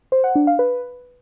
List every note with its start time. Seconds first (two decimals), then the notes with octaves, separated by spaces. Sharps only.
0.12 C5
0.24 F#5
0.36 D4
0.47 F5
0.59 B4